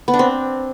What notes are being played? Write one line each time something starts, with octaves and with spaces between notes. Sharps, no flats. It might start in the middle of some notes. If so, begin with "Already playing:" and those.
B3
D4
C4